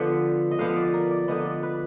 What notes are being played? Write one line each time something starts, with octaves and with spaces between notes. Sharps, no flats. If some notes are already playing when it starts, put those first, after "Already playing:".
Already playing: D3 F3 B3
D#5
D3 F3 B3 F5
D5
A#4
D5
D3 F3 B3 D#5
D5
B4